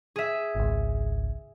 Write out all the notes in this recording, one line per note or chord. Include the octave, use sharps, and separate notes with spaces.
G#4 E5
G#1 C#2